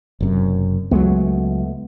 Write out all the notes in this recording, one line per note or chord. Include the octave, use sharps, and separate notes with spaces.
F#1 F#2 C3
C#2 F#3 G#3 A3 B3